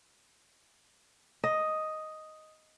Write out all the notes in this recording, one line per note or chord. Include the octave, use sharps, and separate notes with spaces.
D#5